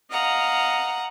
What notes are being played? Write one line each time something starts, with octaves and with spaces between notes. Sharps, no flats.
D#5 F5 F#5 A#5